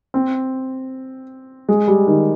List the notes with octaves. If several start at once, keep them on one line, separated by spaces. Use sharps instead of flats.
C4
G#3
G3
D#3